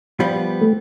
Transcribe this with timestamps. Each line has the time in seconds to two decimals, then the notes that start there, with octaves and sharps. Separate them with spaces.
0.20 F3 G3 B3
0.61 A3